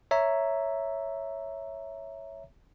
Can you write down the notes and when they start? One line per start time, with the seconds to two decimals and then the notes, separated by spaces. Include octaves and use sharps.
0.11 C#5 E5 A#5